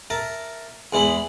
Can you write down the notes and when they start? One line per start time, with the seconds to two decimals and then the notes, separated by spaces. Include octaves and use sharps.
0.10 A#4 E5 A5
0.93 E2 G#3 E4 G#4 B5